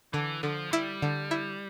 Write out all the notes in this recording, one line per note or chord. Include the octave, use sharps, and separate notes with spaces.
D3 E3
D3 F3
G3 E4
D3
E4